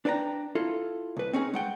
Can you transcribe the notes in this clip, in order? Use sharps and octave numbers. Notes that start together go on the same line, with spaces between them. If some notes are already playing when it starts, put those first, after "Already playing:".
D4 B4 D5 G5 A#5
E4 F4 A4
C2 B4
C4 C#4 D#4 G#4
G#3 F#5 G5